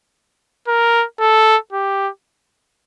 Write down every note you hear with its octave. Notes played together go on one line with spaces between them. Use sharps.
A#4
A4
G4